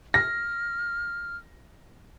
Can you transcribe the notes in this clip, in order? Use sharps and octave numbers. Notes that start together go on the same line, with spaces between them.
F6 A#6